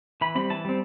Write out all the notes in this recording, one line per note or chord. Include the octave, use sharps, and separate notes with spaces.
E3 B5
G3 C4 B5
E3 A5
G3 C4